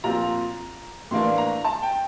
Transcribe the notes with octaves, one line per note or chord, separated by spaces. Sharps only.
A#2 F3 C4 A#5
A2 E3 A#3 D4 C6
A#5
A5
G5